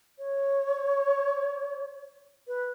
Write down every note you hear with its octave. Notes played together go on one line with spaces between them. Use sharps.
C#5
B4